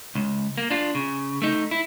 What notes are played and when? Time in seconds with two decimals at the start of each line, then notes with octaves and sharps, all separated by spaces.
0.15 C#2
0.58 A#3
0.70 D4 F4
0.95 C#3
1.42 A3 D#4
1.71 E4